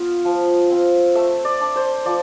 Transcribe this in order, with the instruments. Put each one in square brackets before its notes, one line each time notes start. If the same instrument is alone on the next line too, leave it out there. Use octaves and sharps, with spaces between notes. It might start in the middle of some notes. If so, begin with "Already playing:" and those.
Already playing: [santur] B3 F4 F5
F3
C4
A3 E5
D5
D4
C5
F3 D5